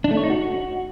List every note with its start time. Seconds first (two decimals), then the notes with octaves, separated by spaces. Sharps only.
0.04 D4
0.11 A3
0.17 C#5
0.24 D#4
0.30 F#4